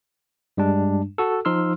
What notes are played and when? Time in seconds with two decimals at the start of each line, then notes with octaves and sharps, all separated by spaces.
0.57 G2 G3 G#3 D4
1.18 F#4 A4
1.45 F3 D#4 C6 E6 F6